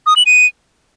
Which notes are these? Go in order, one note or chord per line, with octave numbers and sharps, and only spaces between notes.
D#6
F#7
D#7